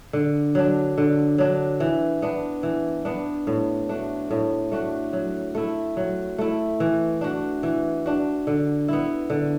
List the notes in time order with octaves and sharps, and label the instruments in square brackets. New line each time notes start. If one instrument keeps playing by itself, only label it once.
[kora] D3
F#3 D4
D3
F#3 D4
E3
B3 D4
E3
B3 D4
A2
A3 D4 F#4
A2
A3 D4 F#4
F#3
A3 E4
F#3
A3 E4
E3
D4 F#4
E3
D4 F#4
D3
B3 E4
D3